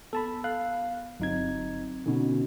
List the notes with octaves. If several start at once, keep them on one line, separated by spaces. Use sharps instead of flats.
B3 A4 A5 B5
F5 F#6
G1 F#3 C4 D#4 G#6
B2 D3 C#4 D#4 F#4